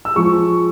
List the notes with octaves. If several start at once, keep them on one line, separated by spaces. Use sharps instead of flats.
E6
F3 G#3 C#6